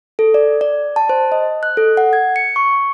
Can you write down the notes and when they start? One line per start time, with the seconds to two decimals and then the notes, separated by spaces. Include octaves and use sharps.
0.19 A4
0.34 D5
0.61 D5
0.96 A5
1.09 C5
1.32 D#5
1.63 F#6
1.77 A4
1.97 F#5
2.13 G#6
2.36 C#7
2.56 C#6